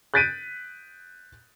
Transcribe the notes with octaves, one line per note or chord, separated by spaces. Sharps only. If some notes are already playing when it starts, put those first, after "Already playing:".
F#6 G6 A6 B6 D7 D#7